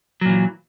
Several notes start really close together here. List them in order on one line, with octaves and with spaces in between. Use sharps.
F#3 A#2 E3